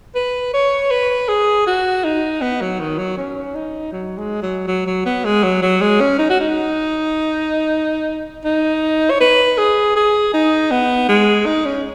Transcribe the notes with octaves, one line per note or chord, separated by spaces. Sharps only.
B4
C#5
B4
G#4
F#4
D#4
B3
F#3
D#3
F#3
C#4
D#4
F#3
G#3
F#3
F#3
F#3
B3
G#3
F#3
F#3
G#3
C#4
D#4
F#4
D#4
D#4
C#5
B4
G#4
G#4
D#4
B3
G#3
D#4
C#4